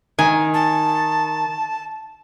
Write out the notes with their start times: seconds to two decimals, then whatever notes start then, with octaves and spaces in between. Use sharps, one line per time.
0.19 D#3 G#5
0.54 A5